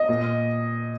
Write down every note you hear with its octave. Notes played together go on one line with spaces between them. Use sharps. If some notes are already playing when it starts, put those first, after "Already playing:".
Already playing: D#5
A#2